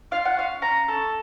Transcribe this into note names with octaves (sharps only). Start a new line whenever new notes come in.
F4 F5
F#5
C#4 F5
C#4 A#5
A4